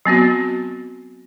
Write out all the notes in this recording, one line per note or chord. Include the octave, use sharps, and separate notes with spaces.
F#3 B3 C4 F#4